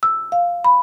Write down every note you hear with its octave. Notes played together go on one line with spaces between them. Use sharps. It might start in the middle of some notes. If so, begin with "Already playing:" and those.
E6
F5
B5